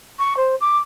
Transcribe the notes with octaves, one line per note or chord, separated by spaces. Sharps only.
C#6
C5
D6